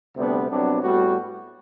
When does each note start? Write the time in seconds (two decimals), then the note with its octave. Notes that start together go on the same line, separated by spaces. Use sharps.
0.16 D2 C3 G3 B3 D4
0.49 C2 C3 F#3 B3 D4
0.82 A2 G3 B3 F#4